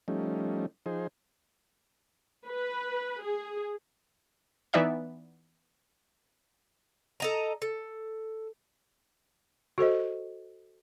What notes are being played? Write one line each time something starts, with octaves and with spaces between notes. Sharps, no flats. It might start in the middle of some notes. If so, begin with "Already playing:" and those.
F3 G3 A3 C#4 D#4
F3 D#4 G#4 C5
B4
G#4
E3 B3 D#4 D5 E5 F#6
A4 D#5 A#5
A4
F#4 A4 C5 D#5